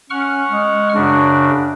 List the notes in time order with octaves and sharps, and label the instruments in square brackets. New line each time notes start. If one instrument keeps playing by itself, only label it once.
[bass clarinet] C#4 [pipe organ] F#5 C#6 F6
[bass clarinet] G#3
[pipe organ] F#2 C#3 F#4 [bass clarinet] D4